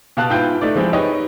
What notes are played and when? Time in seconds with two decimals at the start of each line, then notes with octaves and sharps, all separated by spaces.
0.17 B2 G4 F5 A5 F#6
0.30 G#2 E4 F4 B4 G5 G6
0.61 A3 D#4 D5
0.75 F3 G#3 C4 E4 G4
0.93 D#4 G4 B4 C#5 D#5